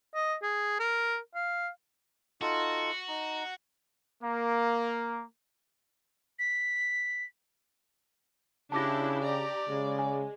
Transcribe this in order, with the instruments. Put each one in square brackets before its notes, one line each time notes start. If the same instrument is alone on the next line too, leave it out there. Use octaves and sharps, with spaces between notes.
[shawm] D#5
G#4
A#4
F5
[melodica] D#4 F4 A4 [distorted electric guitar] F#4
[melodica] D#4 A#5
[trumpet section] A#3
[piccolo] B6
[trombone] C#3 [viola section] D4 E4 G4 [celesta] A5 D6 A#6
[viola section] G4 A#5 [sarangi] D5
[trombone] C#3 [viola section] G#3
[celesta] G#5